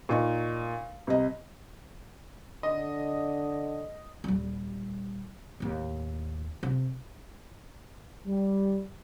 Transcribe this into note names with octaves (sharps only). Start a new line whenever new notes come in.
A#2 D#4 C#6
C2 D#5
D3 D#5
D#1 G3
D#2 A2
C3
G3